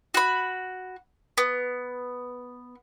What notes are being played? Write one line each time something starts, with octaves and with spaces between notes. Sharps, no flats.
F#4 B5
B3